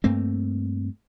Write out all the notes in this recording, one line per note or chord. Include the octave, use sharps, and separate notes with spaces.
G2 A3 A#3 C4